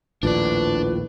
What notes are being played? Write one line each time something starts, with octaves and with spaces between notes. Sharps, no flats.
A#1 D#2 A2 D4 F4 B4 D5